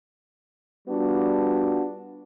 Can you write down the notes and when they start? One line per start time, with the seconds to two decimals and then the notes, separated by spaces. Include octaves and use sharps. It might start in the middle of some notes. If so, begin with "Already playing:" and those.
0.88 G3 B3 D4 F4 F#4